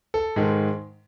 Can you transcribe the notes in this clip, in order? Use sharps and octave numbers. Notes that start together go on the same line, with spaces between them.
A4
G#2 D#3 G#3